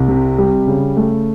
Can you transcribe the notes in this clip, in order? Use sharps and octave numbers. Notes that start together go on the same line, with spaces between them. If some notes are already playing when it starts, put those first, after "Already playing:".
Already playing: C2
C3
G3
C#3
A3